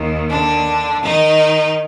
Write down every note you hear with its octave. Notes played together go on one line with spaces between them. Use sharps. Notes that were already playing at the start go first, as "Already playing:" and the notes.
Already playing: D#2 D#3
D3 D4
D#3 D#4